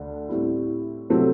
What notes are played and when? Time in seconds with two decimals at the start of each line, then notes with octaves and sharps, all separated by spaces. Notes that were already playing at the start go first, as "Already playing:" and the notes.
Already playing: D2 D3 A3
0.29 A2 G3 C4 E4
1.10 C3 F#3 A3 C4